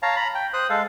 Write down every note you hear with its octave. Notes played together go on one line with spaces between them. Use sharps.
C#5 F5 A5 A#5
A#5 B5
G5
C5 D#6 F#6
G#3 A4 F5